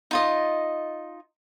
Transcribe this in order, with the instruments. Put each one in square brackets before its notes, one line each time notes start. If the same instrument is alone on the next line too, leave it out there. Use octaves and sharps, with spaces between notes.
[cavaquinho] D#4 F4 D#5